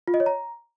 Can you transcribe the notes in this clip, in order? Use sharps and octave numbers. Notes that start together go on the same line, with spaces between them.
F4
D#5
C#5
A#5